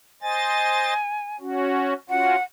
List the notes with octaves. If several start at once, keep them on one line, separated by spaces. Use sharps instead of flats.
C5 D#5 G#5 A6
C#4 F#4
C#4 F4 F#4 F#5